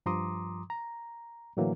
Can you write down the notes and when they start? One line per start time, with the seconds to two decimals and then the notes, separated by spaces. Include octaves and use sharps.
0.06 G2 F3 A#5 C6 D6 D#6
0.70 A#5
1.57 A2 D3 E3 F#3 A#3